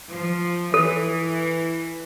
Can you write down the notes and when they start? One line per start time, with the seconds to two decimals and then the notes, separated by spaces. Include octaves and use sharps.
0.12 F3
0.74 E3 A4